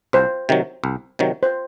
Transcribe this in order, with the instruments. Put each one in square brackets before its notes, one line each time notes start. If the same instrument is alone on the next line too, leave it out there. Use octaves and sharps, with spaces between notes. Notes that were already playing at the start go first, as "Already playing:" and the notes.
[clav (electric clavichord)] C2 [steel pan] C5
[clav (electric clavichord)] C3 D#3 F#3
C2
C3 D#3 F#3
[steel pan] C5